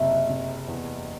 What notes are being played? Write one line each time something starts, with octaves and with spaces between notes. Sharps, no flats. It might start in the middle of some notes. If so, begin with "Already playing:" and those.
Already playing: F#1 C3 E4
C3
E2